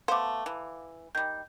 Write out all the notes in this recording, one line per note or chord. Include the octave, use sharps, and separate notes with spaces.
A3 B3 C5 F5 D6
E3
D#3 G3 G6